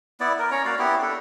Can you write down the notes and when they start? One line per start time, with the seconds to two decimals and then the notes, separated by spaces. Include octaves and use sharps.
0.20 B3 E4 D5
0.39 A#4
0.51 C#4 C#5 A#5
0.65 A#3 F#4 D5 F5
0.79 B3 E4 G4
1.02 D4 A4